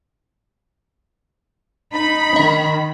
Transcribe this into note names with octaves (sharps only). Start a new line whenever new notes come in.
D#4 B5
D#3 D#5